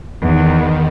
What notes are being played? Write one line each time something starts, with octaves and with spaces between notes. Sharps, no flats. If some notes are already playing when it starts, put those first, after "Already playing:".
E2 D#3